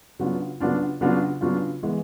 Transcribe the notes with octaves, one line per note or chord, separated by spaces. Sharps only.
C#3 F#3 B3 D4 F4
C#3 F#3 B3 D4 F4
C#3 F#3 B3 D4 F4
C#3 F#3 B3 D4 F4
E3 G#3 B3